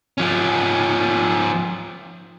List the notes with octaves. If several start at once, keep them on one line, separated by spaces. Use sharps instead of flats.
F3 C#4